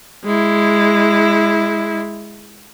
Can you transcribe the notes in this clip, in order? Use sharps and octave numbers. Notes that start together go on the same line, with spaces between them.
G#3 E4